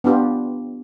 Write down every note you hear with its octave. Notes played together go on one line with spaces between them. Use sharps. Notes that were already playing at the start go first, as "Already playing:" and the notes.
B3 D4 F4 G4